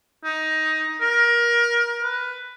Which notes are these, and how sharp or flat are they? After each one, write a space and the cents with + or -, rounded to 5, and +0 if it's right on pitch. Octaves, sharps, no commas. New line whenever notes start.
D#4 +15
A#4 +25
B4 +10